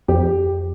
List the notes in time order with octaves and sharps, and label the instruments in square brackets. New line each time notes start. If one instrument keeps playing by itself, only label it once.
[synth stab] F2 [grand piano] G4